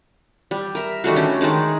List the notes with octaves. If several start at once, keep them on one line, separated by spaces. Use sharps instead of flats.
G3
A#4 E5
D#3 G3 A3 F#4
D3 C#4
D#3 G#3 D#4 D5